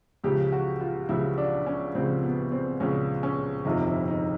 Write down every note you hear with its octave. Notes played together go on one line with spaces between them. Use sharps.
C#2 C#3 F3 G4
F#4
F4
C#2 C#3 F3 E4
D4
C#4
C#2 C#3 F3 C4
B3
C4
C#2 C#3 F3 C#4
C#4
G1 F2 C3 F3 D#4
E4
D#4